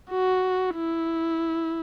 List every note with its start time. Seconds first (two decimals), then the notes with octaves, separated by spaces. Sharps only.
0.10 F#4
0.75 E4